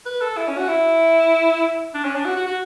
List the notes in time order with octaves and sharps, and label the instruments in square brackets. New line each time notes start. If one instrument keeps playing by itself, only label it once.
[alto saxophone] B4
A4
E4
C#4
F#4
E4
D4
C#4
D4
F#4
F#4
F#4